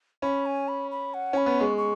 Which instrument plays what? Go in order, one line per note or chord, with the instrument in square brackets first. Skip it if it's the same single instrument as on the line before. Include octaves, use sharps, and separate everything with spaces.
[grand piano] C#4 [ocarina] B5
[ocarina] G#5
B5
B5
F#5
[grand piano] C#4 [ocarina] B5
[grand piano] B3
[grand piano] G#3 [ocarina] C#6
[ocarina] C#6